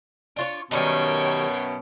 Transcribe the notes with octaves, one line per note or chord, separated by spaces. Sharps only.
D4 F4 C#5
F#2 B2 D#3 G3 D#4 C#5 G5